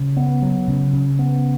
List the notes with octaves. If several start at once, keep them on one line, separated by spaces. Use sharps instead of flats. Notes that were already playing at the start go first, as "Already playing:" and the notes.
Already playing: C#3
B3
F#3
C#3
C#3
B3